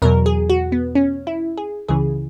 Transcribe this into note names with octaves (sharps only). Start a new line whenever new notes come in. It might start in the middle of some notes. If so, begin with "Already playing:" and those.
E2 B2 F#3 A#4
G#4
F#4
B3
C#4
E4
G#4
C#2 C#3 E3 G#4